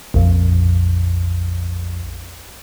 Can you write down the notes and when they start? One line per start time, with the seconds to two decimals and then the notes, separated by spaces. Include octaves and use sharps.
0.14 A#1 F2